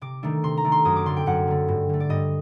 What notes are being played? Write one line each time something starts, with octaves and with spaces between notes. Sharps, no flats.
C3 D6
D#3 A3 D4
C3 C6
A#5
D#3 A3 D4
C6
F#2 D#6
D6
D3 A3 C6
G5
F#2 F#5
D3 A3
G2
D3 A3
D5
G2 D#5